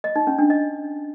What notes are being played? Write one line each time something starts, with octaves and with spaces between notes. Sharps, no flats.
D#5
D#4
C#4
D4
D#5